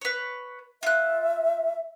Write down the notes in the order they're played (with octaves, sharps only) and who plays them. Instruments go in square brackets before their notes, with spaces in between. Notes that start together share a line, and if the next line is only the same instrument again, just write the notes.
[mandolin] B4 C#5
[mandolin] F4 F#6 [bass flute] E5